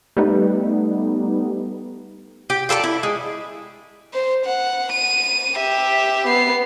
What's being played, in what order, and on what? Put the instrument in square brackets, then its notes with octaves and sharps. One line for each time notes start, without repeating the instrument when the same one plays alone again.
[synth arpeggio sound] G3 A3 B3 D#4
[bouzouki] G4
F4 A4 A#4 D5
E4
G#3
[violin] C5
F#5
D#7
G4 E5
B3 C7